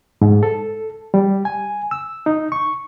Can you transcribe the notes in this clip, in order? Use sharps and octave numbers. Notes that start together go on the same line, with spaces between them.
G#2
A4
G3
G#5
E6
D#4
C#6